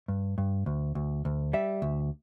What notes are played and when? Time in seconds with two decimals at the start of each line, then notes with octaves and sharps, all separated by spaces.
0.08 G2
0.38 G2
0.66 D2
0.95 D2
1.25 D2
1.53 G3 E5
1.82 D2